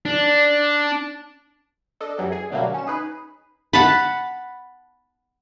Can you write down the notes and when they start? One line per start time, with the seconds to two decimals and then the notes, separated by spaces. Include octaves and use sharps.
0.05 D4
2.01 D4 A4 D#5
2.18 F#2 E3 F#3 G3
2.32 G#4
2.50 B2 D3 F#3 G3 A3 A#3
2.74 C#4 E7
2.87 D#4 G#4 B4
3.73 F#5 A5 B5